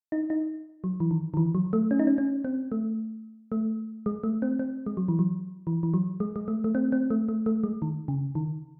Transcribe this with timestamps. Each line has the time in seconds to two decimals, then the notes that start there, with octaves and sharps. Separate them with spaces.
0.12 D#4
0.30 D#4
0.84 F#3
1.00 E3
1.11 D#3
1.34 D#3
1.37 E3
1.55 F#3
1.73 A3
1.91 C#4
1.99 D#4
2.07 C#4
2.18 C#4
2.45 C4
2.72 A3
3.52 A3
4.06 G#3
4.23 A3
4.42 C4
4.59 C4
4.86 G#3
4.97 F#3
5.08 E3
5.19 F#3
5.67 E3
5.83 E3
5.94 F#3
6.20 G#3
6.36 G#3
6.48 A3
6.64 A3
6.75 C4
6.92 C4
7.10 A3
7.28 A3
7.46 A3
7.64 G#3
7.82 D#3
8.08 C#3
8.35 D#3